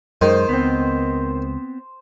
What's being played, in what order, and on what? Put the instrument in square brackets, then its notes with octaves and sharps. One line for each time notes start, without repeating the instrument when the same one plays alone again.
[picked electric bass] F#2 G#3 [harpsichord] D#3 [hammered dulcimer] C5
[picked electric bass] C#2 [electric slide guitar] B3 C4